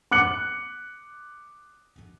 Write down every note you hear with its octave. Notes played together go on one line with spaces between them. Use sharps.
D6 F#6 C#7 F#7